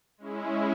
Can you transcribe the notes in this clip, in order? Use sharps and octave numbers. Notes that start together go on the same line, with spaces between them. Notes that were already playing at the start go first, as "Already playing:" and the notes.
G#3 C#4 E4